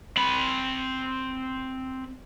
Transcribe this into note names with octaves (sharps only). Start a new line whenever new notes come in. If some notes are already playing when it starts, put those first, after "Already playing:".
C4 B5